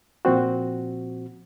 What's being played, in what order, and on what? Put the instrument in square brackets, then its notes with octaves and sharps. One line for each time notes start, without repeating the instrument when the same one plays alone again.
[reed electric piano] A#2 F3 C4 F#4